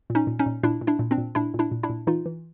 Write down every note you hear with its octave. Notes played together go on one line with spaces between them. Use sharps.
A#2
C#4 D#4
A#2
C#4 D#4
A#2
A#2 D4 E4
A#2
D4 E4
A#2
C4 D4
A#2
A#2 D4 E4
A#2
D4 E4
A#2
D4 E4
A#2
E3 D#4 F4
E3